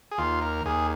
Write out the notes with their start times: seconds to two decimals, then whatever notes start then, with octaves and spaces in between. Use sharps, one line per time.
0.11 G#4
0.18 D#2 F4
0.42 A#4
0.65 D#2 G#4